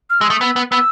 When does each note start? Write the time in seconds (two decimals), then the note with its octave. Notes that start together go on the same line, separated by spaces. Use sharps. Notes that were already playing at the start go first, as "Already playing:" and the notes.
0.10 F6
0.21 G#3 E6
0.30 A3 D#6
0.41 B3 E6
0.56 B3
0.71 B3 E6